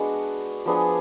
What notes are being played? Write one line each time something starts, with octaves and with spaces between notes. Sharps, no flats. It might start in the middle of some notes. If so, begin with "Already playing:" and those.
Already playing: G#3 B3 D4 F#4
F3 B3 D4 G#4